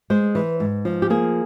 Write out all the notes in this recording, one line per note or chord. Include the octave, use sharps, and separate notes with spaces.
G#3 C5
E3
G#2
F3
G4
A#3 G#4